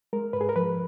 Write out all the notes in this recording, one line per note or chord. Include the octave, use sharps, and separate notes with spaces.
G#3 A#4
G#2 B4
G#4
A#4
F3 B4